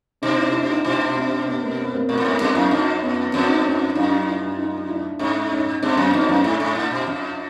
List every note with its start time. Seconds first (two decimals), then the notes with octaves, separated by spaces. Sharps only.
0.22 B2 C#4 D#4
0.37 D4 E4
0.53 D4 E4
0.69 D#4 F4
0.84 B2 D4 E4
1.16 C4 D4
1.46 B3 C#4
1.61 A#3 C4
1.78 B3 C#4
1.93 A#3 C4
2.09 A#2 A#3 C4
2.18 A2
2.24 G#2 B3 C#4
2.40 G2 C4 D4
2.55 F#2 D4 E4
2.71 F2 C#4 D#4
3.02 B3 C#4
3.33 F2 C4 D4
3.48 C#4 D#4
3.65 C#4 D#4
3.95 F#2 D#4 F4
4.26 D4 E4
4.58 D#4 F4
4.89 D4 E4
5.19 G#2 C#4 D#4
5.51 C#4 D#4
5.82 G2 C4 D4
5.97 F#2 B3 C#4
6.13 F2 C#4 D#4
6.29 F#2 C#4 D#4
6.44 G#2 D4 E4
6.60 G#2
6.75 A2 D4 E4
6.91 B2
7.07 F2